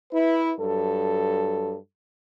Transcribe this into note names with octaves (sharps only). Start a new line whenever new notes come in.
E4 B4
G2 F#3 A4